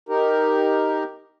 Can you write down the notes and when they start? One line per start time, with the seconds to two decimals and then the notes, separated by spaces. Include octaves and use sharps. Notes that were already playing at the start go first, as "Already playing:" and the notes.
0.09 D#4 G4 A#4